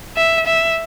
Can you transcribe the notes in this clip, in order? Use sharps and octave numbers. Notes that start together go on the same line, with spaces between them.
E5
E5